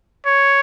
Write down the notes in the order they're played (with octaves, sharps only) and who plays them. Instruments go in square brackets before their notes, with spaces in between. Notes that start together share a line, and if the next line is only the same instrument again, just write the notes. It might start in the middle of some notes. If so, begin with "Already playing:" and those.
[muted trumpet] C#5